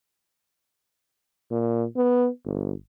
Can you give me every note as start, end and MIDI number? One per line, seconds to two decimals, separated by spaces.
1.51 1.84 46
1.97 2.28 59
2.45 2.73 31